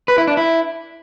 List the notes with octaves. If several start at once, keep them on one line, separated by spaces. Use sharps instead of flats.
B4
E4
D4
E4